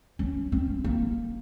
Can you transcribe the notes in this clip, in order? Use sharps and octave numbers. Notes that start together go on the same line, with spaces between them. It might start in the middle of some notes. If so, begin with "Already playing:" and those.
C#4
C4
A#3